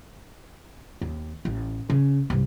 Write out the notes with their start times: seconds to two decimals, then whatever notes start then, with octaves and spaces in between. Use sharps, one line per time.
1.01 D#2
1.45 A1
1.90 C#3
2.30 C2 G2